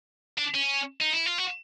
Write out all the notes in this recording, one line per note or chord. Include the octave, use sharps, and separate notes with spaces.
D4
C#4
D#4
E4
F4
F#4